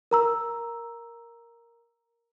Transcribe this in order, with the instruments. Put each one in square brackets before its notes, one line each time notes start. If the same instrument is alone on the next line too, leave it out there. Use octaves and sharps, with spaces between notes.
[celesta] A#4 A#5 E6